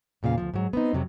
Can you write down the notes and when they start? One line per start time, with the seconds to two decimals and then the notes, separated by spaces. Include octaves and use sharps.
0.23 E2 A#2 C#3 F5
0.38 D2 G#2 F3
0.54 G#2 F#3
0.73 B3 C4 D#4
0.93 F2 C3 F#3